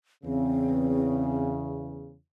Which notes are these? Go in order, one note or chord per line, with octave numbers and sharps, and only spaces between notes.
E2 C#3 C4